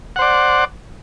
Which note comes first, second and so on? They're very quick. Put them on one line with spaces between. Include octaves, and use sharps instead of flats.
F#5 C5 D5